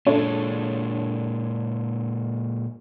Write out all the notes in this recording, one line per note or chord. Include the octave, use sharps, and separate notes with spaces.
A#2 G#3 D4 A4 C#5